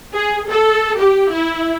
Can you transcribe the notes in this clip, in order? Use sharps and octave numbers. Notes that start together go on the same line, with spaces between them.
G#4
A4
G4
E4